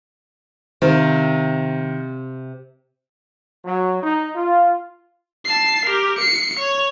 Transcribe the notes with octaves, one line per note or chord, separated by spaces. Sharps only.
C3 D#3 G4 F5
F#3
D#4
F4
A5 C7
G4 A#4
C7 C#7
C#5